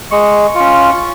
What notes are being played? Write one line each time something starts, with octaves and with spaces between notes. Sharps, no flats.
G#3 C#6
C#4 F4